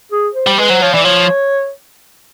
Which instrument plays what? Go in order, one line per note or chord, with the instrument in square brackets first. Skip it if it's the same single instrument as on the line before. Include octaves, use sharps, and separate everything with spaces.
[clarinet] G#4
C5
[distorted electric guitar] G3
[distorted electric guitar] G#3 [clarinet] B4
[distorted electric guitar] F#3 [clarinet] C5
[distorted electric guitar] F3 [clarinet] C#5
[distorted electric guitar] E3 [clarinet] D5
[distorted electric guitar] F3 [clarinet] C#5